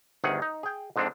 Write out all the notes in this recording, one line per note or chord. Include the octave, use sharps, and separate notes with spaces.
G1 D2 D#3 G#4 F#5
D#4
G#4 G5
F2 G#2 G#3 C4 D4